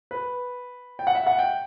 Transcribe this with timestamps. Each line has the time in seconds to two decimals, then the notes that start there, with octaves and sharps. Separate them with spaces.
0.11 B4
0.99 G5
1.07 F#5
1.15 E5
1.27 F#5
1.39 G5